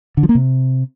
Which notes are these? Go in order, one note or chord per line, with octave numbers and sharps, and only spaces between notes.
D3
F3
A#3
C3